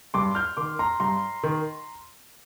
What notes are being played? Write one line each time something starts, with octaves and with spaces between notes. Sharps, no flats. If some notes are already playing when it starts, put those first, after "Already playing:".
G2 C6 D6
F6 G6
D#3 C6 D6
A#5 C6
G2 A#5 C6
D#3